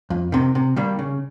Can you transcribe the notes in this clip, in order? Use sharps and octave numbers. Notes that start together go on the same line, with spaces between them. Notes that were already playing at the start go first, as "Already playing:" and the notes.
F2
C3 D#3
C3
D#3 G3 A#3
C#3